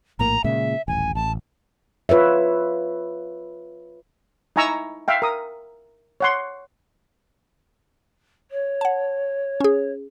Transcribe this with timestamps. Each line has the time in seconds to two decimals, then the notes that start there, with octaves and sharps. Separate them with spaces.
0.19 A#1 A2 A#3 A#5
0.44 A#2 C#3 G#3 E5
0.88 D#1 A1 G#5
1.15 A1 A5
2.09 F4 B4 C#5 E5
4.56 D#4 E4 G#5 A#5 C#6 E6
5.08 E5 F5 G5
5.22 A#4 D#6
6.20 C#5 F#5 C6
8.51 C#5
8.81 F#5 A5
9.60 C#4 G#4